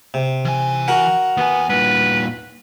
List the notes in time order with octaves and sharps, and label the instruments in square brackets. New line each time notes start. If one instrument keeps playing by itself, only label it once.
[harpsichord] C3
[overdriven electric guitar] E3 G#5
[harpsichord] F#4 A#4 F#5
[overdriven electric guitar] D#2 G#5 [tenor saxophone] B3
[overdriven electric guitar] G2 A#2 [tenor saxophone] B4